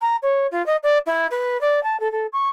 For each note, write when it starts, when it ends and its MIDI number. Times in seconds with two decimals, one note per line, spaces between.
0.01 0.17 82
0.22 0.47 73
0.51 0.64 65
0.66 0.76 75
0.83 0.98 74
1.06 1.27 64
1.31 1.60 71
1.61 1.82 74
1.83 1.99 81
2.00 2.10 69
2.12 2.27 69
2.33 2.49 85